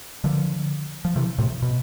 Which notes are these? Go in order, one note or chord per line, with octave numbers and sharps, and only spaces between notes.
D3 F3
F3
C3 E3
A2 C3
B2